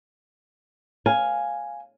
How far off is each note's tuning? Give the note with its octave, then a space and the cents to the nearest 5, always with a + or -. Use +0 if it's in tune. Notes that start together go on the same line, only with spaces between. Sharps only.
F5 +0 G#5 +0